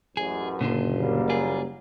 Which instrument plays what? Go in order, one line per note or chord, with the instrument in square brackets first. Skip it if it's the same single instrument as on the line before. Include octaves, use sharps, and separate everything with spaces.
[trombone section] A1 F#2 [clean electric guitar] G#4
[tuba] F#1 [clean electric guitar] A#2 D3 F4
[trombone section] F#3 G3 A#3
[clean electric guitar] F4 G#4